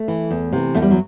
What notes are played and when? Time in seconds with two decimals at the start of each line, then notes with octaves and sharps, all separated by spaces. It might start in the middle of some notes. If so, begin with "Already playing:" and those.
Already playing: A3
0.08 E3
0.31 E2
0.53 C3 E3
0.75 E2 A3
0.82 G3
0.91 F#3